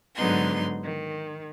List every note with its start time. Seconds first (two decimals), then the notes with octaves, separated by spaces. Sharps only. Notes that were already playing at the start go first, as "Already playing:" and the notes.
0.15 G#2 D3 F#3 B3 D#4 C6
0.83 D#3